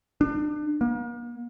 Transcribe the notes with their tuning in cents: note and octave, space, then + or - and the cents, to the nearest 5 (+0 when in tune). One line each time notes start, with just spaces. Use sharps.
D4 +35
A#3 +40